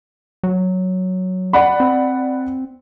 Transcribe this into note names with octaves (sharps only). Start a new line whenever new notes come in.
F#3
D5 F#5 B5
C4